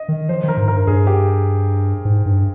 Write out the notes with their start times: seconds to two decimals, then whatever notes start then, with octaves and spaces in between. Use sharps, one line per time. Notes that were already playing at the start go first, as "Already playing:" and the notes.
Already playing: D#5
0.09 D#3
0.29 F3 C5
0.44 D#3 A#4
0.57 G#2
0.68 A#4
0.73 G2
0.87 G2 G#4
1.07 G4
2.05 G#2
2.26 G2